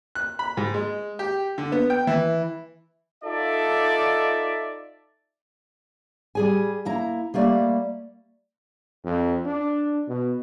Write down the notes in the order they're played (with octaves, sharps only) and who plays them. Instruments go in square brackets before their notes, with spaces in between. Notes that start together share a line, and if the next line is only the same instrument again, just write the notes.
[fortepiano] F#6
B5
G#2
G#3
G4
D3
B3
G5
E3
[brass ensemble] D#4 F4 A4 D5 E5
[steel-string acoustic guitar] G3 G#4 G#5
A#3 E4 A#5
G3 A3 A#3 D5
[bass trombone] F2
D4
B2